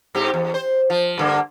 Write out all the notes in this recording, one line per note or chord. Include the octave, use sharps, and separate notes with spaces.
G#2 C4 G4
E2
C5
F3
G2 D3 A#3